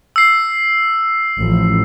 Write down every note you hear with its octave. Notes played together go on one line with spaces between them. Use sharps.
E6 C7
A1 F3